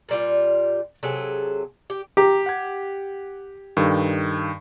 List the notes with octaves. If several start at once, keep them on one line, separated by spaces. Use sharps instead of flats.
A#2 G3 F4
C3 F#3 G#4 A4
G4
G4 A#5 D6
F#5 G#6
G2 D#3 A4